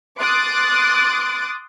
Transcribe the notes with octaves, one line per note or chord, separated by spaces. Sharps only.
C6 D6 D#6 F#6 A6 D7